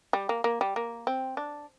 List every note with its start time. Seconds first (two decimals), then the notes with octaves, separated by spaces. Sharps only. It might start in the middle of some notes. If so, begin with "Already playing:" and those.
0.13 G3
0.29 A#3
0.44 A#3
0.61 G3
0.76 A#3
1.07 C4
1.37 D4